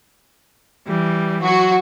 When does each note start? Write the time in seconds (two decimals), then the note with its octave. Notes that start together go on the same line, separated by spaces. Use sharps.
0.86 E3 G3
1.43 F#3 F#4